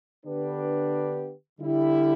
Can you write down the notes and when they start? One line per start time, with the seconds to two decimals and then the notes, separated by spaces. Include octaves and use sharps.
0.25 D3 B3 D4 G4 B4
1.60 D3 G3 E4